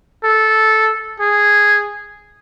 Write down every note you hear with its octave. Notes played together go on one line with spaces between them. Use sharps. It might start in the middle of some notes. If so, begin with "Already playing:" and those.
A4
G#4